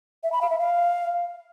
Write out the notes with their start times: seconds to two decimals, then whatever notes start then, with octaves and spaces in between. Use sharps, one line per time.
0.23 E5
0.32 B5
0.41 F5
0.50 E5
0.59 F5